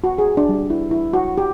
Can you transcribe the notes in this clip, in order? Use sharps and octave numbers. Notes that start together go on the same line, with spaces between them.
F#4
G#4
D4
G3
E4
E4
F#4
G4